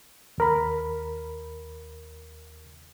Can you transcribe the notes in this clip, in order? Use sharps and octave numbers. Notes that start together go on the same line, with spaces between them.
D#2 A#4 B5